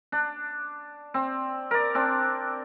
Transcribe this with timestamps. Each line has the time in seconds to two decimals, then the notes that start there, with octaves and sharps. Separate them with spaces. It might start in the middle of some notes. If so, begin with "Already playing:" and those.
0.12 D4
1.14 C4
1.71 A#4 D5
1.95 C4 D4